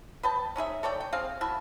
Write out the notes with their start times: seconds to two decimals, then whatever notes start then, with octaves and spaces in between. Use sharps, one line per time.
0.23 B4 D#5 G5 A5
0.56 C#4 D#4 G#4 E5
0.83 A4 C#5 D5 G5
1.00 G5
1.13 C4 G#4 F5
1.41 E4 F#4 E5 A5